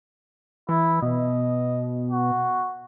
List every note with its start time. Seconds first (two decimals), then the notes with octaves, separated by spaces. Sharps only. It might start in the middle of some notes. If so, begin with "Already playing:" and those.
0.69 E3 E4
1.02 B2 D#5
2.11 F#4